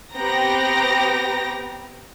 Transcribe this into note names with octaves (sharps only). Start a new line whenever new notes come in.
B3 C4 G4 G5 A#5 A#6